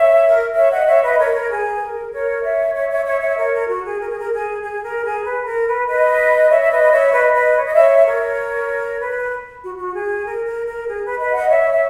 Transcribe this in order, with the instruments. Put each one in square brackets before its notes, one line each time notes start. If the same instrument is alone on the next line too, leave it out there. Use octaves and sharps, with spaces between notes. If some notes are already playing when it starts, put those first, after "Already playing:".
Already playing: [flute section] C#5 E5
A#4
C#5 E5
D#5 F#5
C#5 E5
B4 D#5
A#4 C#5
A#4
G#4
B4
A#4
A#4 C#5
C#5 E5
C#5 E5
C#5 E5
C#5 E5
C#5 E5
A#4 C#5
A#4
F#4
G#4
A#4
G#4
A#4
G#4
G#4
A#4
G#4
B4
A#4
B4
B4 D#5
C#5 E5
E5
B4 D#5
C#5 E5
B4 D#5
B4 D#5
C#5
D#5
C#5 E5
A#4 C#5
B4
F#4
F#4
G#4
A#4
A#4
A#4
G#4
B4
B4 D#5
D#5 F#5
C#5 E5
E5